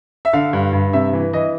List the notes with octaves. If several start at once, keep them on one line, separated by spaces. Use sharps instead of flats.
E5
D3 F5
G2
G2
C3 E5
E3
E3 D#5